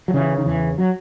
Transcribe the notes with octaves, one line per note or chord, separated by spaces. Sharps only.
F#3
C#3 E3
D#3
E2 E3
F#3